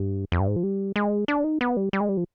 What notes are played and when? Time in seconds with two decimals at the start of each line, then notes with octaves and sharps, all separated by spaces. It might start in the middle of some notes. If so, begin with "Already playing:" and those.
Already playing: G2
0.32 F2
0.40 G2
0.48 G#2
0.56 F3
0.63 G3
0.96 G#3
1.28 D4
1.44 D#4
1.61 B3
1.77 G3
1.93 G3
2.00 G#3
2.09 G3
2.17 F3